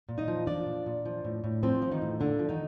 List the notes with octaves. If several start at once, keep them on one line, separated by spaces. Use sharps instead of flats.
A#2
D#4 D#5
F3
F3 D4 D5
A#2
A#2
F3
A2
A2
F3 C4 C5
F3
D#3 D#4
A2
A#2 D3 D4
F3
D#3 D#4